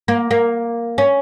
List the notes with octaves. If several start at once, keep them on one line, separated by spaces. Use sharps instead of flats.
A#3
A#3
C#4